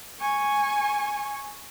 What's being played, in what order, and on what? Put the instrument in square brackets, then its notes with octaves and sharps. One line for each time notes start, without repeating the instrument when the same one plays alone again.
[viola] G#5 C#6